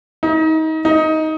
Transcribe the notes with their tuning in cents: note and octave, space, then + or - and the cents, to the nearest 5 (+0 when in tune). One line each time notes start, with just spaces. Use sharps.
D#4 +30
D#4 +15